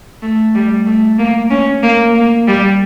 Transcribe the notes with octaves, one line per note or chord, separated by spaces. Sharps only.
A3
G3
A3
A#3
C#4
A#3
A#3
G3